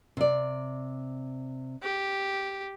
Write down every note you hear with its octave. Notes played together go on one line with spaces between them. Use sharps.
C3 D5
G4